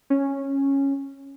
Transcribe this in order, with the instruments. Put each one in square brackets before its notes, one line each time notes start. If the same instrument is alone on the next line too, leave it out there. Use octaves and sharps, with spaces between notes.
[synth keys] C#4